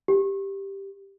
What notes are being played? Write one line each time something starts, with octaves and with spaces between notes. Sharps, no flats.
G4